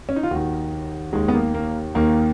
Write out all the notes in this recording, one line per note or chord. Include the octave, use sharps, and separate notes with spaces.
C#4
D#4
F4
D#2 D#3 F#4
D#2 D#3 G#3
B3
A#3
A#3
D#2 D#3 A#3